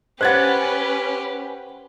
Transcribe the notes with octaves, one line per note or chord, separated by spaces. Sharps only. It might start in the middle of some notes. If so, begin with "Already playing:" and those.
C#4 G4 B4 C5 F#5 F#6 G#6 A6